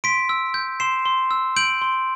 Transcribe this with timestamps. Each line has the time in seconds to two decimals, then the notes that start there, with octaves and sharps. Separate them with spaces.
0.04 C6 B6 D7
0.29 E6
0.54 G6
0.80 C6 C7 E7
1.05 C6
1.31 E6
1.56 G6 D7 F#7
1.81 C6